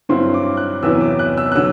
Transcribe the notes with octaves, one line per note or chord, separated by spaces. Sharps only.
G2 D3 F#3 C4 E4 C6
D6
F#6
E2 C3 F#3 B3 E4 E6
D6
F#6
E6
F#6
D3 F#3 E6